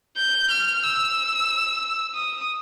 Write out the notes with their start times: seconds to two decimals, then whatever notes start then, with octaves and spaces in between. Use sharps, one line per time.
0.16 G6
0.50 F6
0.83 E6
2.14 D#6